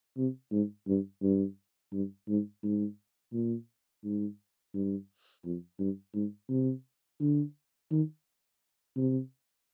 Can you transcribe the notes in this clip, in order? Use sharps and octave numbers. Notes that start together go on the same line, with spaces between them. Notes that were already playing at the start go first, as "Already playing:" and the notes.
C3
G#2
G2
G2
G2
G#2
G#2
A#2
G#2
G2
F2
G2
G#2
C3
D3
D#3
C3